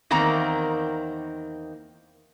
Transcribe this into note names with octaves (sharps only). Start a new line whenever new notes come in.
E2 D#3 A#3 C4 A#5